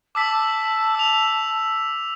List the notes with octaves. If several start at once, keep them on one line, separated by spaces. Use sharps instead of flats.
A5 D6 E6 B6
E6 F7